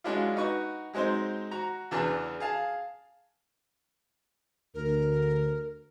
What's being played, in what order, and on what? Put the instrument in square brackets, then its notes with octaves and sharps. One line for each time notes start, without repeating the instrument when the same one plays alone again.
[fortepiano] F#3 G#3 C#4 D4 E4 F4
D#4 F#4 B4 C#6
F#3 G#3 C4 D#4 C5
F#4 A#5
E2 C#3 E3 D4 B4 A5
G#4 F5 A5
[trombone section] D2 [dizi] A#4